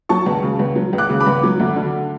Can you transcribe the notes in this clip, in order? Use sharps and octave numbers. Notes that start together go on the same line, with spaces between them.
F#3 A5 C#6
C#2
C#3
C#2
F#3
C#2
D6 F#6
C#3
B5 D6
C#2
F#3
D2
D3